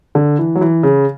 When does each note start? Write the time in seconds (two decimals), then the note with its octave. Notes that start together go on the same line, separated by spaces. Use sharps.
0.15 D3
0.39 E3
0.55 F#3
0.61 E3
0.83 C#3